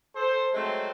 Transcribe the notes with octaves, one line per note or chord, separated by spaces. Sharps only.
A4 C5
F#3 G#3 A3 C4